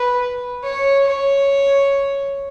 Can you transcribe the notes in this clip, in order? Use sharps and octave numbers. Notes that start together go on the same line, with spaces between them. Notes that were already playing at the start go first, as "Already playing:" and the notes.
Already playing: B4
C#5
C#5